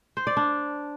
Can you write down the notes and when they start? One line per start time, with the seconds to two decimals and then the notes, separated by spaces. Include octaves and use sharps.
0.17 C5
0.27 D5
0.37 D4